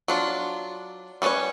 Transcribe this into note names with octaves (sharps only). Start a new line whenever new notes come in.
F#3 D4 F4
G3 C#4 D4 B4 C#5